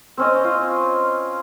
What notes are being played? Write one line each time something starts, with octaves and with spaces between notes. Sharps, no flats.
C4 C#4 D#5
F4